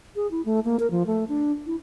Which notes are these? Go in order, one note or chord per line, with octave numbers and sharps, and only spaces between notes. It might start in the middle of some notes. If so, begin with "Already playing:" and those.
G#4
E4
A3
A#3
A#4
F3
A3
D4
E4